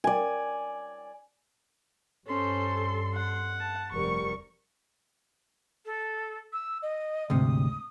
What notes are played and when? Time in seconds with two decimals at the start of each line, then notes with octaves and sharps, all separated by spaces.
0.04 D5 G#5
2.27 G2 C#4 A4 C5 C6
3.14 F#5
3.60 A5
3.93 F1 G3 A#4 C#6
5.85 A4
6.53 E6
6.82 D#5
7.30 D2 G#2 C3 D#6